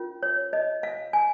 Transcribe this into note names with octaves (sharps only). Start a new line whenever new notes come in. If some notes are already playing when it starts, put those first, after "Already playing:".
Already playing: C#4 F4 A#4
C#5
D#5
F5
G#5